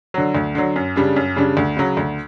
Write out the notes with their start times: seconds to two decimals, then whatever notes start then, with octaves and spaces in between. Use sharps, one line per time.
0.14 D3 F#3
0.35 D2
0.55 D3 F#3
0.76 F#2
0.96 C#3 G3 D4
1.16 F#2
1.36 C#3 G3 D4
1.57 D2
1.77 C#3 F#3
1.97 D2